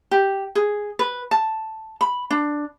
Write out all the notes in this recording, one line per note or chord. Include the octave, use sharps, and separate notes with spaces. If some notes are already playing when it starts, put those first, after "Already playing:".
G4
G#4
B4
A5
B5
D4